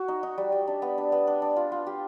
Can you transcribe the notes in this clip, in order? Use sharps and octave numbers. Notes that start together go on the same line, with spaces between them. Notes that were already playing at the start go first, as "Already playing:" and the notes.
Already playing: F#4
D#4
D#4
G3
G3
D4
B3
D4
B3
D4
D4
F4
F4
G4